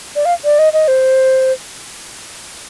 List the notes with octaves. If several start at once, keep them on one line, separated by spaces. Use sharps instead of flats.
D5
F5
D5
D#5
D#5
C5